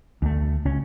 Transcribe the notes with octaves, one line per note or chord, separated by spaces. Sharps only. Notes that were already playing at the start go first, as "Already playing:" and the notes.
D2 A3
C#2 C#4